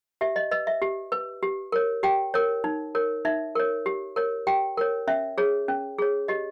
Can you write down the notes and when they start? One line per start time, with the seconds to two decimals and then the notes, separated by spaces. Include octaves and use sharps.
0.21 G4 E5
0.36 D#5
0.51 B4 D#5
0.67 E5
0.82 G4
1.12 B4
1.42 G4
1.72 A#4 C#5
2.03 G4 G5
2.34 A#4 C#5
2.64 D#4
2.95 A#4 C#5
3.25 D#4 E5
3.55 A#4 C#5
3.86 G4
4.16 A#4 C#5
4.47 G4 G5
4.77 A#4 C#5
5.07 C#4 E5
5.38 G#4 C#5
5.68 C#4
5.98 G#4 C#5
6.28 G4 D#5